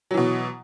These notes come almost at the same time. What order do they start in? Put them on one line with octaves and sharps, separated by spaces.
F#3 E3 B2